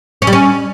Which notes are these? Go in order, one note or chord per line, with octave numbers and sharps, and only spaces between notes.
C#4
G3
C#4